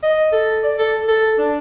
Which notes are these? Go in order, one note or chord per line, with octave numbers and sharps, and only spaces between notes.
D#5
A4
D5
A4
A4
D4